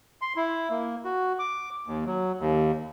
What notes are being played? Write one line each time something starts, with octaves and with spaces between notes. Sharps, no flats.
C6
E4
A#3
F#4
D6
D#2
F#3
D#2